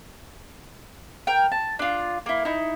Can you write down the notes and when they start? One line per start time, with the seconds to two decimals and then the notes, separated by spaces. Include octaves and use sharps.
1.27 A#4 G5
1.52 A5
1.79 D4 F4
2.26 A#3 E4
2.45 D#4 E4